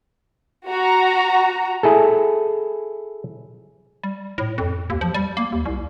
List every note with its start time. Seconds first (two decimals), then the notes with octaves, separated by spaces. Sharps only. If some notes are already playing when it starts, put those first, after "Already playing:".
0.67 F#4 A#5
1.83 E4 G#4 A4
4.04 G3
4.38 A2
4.58 F2
4.90 D#2
5.01 F3
5.14 G3
5.37 A#3
5.52 D#2
5.66 C2